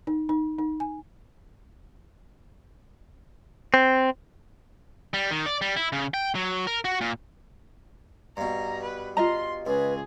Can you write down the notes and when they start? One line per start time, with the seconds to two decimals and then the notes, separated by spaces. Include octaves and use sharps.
0.07 D#4
0.29 D#4
0.59 D#4
0.80 G#5
3.74 C4
5.14 G3
5.31 D#3
5.46 D5
5.62 G3
5.77 E4
5.93 C#3
6.14 G5
6.35 F#3
6.67 A#4
6.85 F#4
7.01 A#2
8.37 G2 B2 A#5
8.83 B4
9.17 F4 D#5 A#5 C6
9.67 C#2 G#4 B4